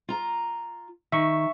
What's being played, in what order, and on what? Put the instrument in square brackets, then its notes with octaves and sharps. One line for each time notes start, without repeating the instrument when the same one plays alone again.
[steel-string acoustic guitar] F4 A#5
[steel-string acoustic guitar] D#3 [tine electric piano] E5 C#6